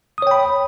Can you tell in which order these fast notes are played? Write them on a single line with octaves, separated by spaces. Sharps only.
D#6 C#5 G5 B5